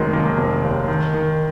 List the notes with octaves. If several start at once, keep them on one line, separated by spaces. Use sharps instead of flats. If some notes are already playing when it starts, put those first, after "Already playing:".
Already playing: F1 D#3 F#3 G#3 A#3
D#3 A#3
F1
D#2
D#3
D#3